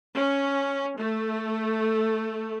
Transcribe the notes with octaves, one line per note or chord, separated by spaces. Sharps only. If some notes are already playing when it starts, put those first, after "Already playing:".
C#4
A3